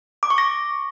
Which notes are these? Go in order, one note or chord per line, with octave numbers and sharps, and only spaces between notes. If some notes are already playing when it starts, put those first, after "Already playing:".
D6
C#6
A#6